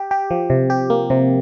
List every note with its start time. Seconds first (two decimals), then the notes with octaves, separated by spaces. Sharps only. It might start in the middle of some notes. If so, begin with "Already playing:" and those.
Already playing: G4
0.11 G4
0.31 F3
0.50 C3
0.70 G4
0.90 A#3
1.10 C3